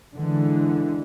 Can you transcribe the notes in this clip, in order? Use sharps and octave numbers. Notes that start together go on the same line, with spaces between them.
D3 E3 G#3